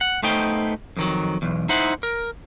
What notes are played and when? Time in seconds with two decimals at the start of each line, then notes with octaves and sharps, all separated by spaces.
0.01 F#5
0.23 A3 B3 D#4 C5 G5
0.97 F2 D#3 F#3
1.42 B1 E2
1.69 D#4 E4 C5 E5 F#5
2.03 A#4